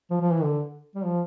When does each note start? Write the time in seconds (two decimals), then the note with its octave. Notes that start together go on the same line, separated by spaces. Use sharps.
0.11 F3
0.21 F3
0.31 E3
0.43 D3
0.95 G3
1.05 F3